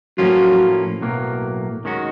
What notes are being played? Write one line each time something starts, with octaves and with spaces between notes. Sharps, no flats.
A2 F3 F#3 A#3 C#4 F4
B1 A2 F#3 A#3
D#2 D#3 G#3 C#4 F#4